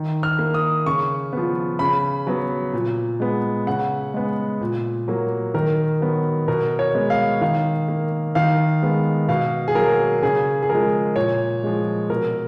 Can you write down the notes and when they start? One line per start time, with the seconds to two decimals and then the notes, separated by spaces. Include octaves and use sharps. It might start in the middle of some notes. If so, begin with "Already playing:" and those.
Already playing: D#3
0.23 F6
0.39 A#3
0.54 D#6
0.86 C#3 C#6
1.33 F3 B3
1.79 C#3 B5
2.27 F#3 B3
2.73 A#2
3.20 G#3 B3
3.67 C#3 F#5
4.14 G#3 B3
4.61 A#2
5.08 F#3 A#3
5.54 D#3 A#4
6.01 F#3 B3
6.48 B2 A#4
6.79 C#5
6.95 G#3 B3
7.10 F5
7.41 D#3 F5
7.88 A#3
8.35 D#3 F5
8.83 G#3 B3
9.29 B2 F5
9.68 G#4
9.75 F#3 A#3 A#4
10.22 C#3 G#4
10.63 G#4
10.70 F3 G#3 A#4
11.16 A#2 C#5
11.63 F3 G#3
12.10 B2 A#4